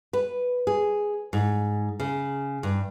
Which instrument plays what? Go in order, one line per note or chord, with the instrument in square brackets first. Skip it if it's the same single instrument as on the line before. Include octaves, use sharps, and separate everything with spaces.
[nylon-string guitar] B4
G#4
G#2
C#3
G2